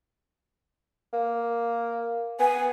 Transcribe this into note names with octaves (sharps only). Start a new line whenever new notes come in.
A#3
B3 G#5